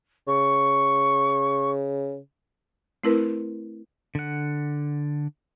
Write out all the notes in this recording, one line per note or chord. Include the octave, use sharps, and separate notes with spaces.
C#3 C#6
A3 C4 E4 A#4 B4
D3 F#5